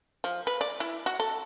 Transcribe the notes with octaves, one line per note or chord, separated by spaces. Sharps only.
F3
B4
D5
E4
F#4
A4